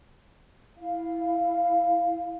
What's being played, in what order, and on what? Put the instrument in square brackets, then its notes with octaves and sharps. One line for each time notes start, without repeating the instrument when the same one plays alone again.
[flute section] E4 F5